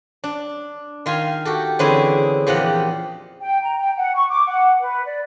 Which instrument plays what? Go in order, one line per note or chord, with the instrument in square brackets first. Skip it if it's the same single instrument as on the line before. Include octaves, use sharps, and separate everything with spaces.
[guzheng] D4
D#3 F4 F5 G#5
F#4 G4 A4
D3 E3 C4 C#4 E4 G#4
E2 A#2 F3 G4 D#5 F#5
[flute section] G5
A#5
G5
F#5
C#6
D6
F#5
B4
D5